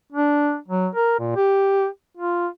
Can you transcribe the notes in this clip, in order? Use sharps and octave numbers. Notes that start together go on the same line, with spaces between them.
D4
F#3
A#4
A#2
G4
F4